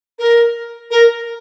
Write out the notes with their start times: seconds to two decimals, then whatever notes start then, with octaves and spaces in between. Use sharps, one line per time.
0.19 A#4
0.91 A#4